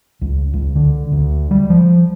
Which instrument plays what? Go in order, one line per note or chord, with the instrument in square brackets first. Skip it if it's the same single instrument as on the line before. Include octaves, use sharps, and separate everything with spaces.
[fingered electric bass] C#2
C#2
D3
D2
G3
F3